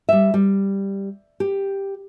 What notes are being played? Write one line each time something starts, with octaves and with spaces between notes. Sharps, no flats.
G3 E5
G3
G4